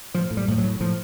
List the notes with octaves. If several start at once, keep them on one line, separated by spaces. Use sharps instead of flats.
A2 F3
A2
G3
A2 F3
F#3
A2
A2 F3